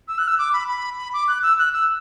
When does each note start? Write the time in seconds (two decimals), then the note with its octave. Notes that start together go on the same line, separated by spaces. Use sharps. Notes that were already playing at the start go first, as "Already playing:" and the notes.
0.08 E6
0.18 F#6
0.28 E6
0.39 D6
0.53 B5
0.69 B5
0.98 B5
1.13 D6
1.28 F#6
1.43 E6
1.59 F#6
1.74 E6